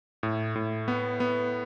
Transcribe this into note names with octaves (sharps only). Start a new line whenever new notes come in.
A2
A2
B3
B3